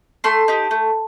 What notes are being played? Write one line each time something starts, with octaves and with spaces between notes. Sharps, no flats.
A3 A5 C6
D#4 G4
A3